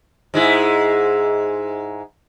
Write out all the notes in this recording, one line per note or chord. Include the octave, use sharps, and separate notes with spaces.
G#2 G#3 E4